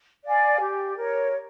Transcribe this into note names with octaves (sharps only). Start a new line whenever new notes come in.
D5 F5 G#5
G4
A#4 C#5